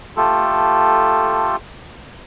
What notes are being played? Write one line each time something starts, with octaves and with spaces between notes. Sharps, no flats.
A3 F4 G4 A4